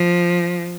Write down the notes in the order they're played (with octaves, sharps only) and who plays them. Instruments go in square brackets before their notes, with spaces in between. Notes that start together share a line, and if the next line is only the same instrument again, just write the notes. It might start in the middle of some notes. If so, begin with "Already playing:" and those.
Already playing: [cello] F3